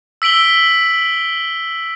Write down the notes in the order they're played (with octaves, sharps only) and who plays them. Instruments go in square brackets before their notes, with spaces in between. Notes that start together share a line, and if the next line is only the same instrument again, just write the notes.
[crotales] E6 B6 D7 F#7 G7